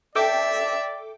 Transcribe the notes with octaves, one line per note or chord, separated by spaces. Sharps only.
A4 D5 E5 G5 D6